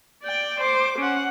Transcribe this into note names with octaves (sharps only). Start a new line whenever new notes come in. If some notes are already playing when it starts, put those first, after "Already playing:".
D5 G5
C5 D6
C#4 F#5